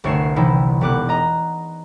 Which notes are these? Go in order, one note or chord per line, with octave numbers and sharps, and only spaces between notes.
G1 C2 A3 C#5 C7 E7
C3 E3 G3 D#4 E4
E1 B3 D6 F#6
D#5 A#5